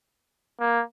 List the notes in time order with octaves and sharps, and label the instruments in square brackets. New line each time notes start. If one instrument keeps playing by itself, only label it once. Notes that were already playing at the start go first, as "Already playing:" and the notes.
[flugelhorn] A#3